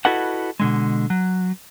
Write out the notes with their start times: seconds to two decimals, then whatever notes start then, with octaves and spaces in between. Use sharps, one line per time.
0.05 E4 F#4 A4 B4 D#5 F#5
0.60 B2 D3 G#3
1.10 F#3